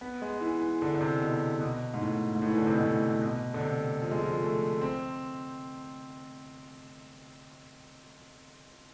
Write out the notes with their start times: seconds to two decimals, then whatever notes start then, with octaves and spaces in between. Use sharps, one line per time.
0.01 B3
0.22 G#3
0.41 E3
0.61 E3
0.82 D3
0.95 D3
1.01 C3
1.22 B2
1.61 B2
1.94 G#2
2.02 A2
2.35 G#2
2.42 A2
2.51 E3
2.58 D3
2.66 C3
2.73 B2
2.81 A2
3.22 B2
3.54 D3
3.61 C3
4.02 F3
4.11 G#3
4.21 F3
4.42 A3
4.81 C4